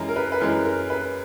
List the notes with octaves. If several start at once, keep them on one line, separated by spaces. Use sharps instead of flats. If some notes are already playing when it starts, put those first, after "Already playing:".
Already playing: F#2 E3 G#3 A#5
A#4
B4
B4
F#2 E3 G#3 A#4
A#4
B4